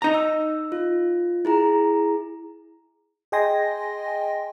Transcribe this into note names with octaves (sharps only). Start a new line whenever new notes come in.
D#4 A#5
E6
F4
E4 G#4 A#5
G#4 D#5 G5 G#5 C6 A#6